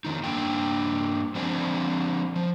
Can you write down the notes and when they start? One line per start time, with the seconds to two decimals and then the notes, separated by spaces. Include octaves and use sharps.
0.05 F2 D#3 D#4
0.24 G2 A#3 D4 G5
1.35 F3 C4 D4 D5 G#5
2.36 F3